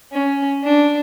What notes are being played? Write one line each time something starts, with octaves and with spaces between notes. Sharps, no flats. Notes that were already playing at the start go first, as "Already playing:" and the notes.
C#4
D4